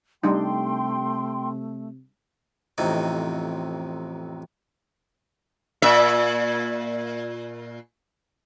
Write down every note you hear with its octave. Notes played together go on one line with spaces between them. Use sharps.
C3 G3 A3 D4 D#4 G5 C6
A1 F2 C3 D#4
A#2 E5